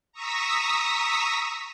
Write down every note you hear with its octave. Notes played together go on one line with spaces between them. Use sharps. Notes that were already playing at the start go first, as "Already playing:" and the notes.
A#5 C#6 D#6 E6 A#6 B6